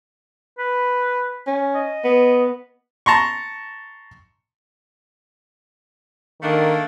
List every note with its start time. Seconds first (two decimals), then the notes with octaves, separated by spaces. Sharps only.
0.59 B4
1.47 C#4
1.75 D#5
2.04 B3
3.06 A5 A#5 C6 C#6
6.42 D#3 A3 A#3 D4